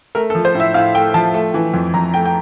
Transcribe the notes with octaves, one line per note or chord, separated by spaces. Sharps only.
A3 A#4
A4
F3
C5
A2
E5
A2 F5
A3 G5
F3 A5
A3
E3
F2
F2 A#5
A3 G5
G5